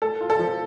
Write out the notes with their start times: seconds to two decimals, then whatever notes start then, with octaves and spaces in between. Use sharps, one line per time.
0.02 A3 A4
0.21 F4
0.30 A4
0.39 F3